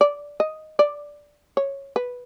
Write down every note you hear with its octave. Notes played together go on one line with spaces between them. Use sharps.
D5
D#5
D5
C#5
B4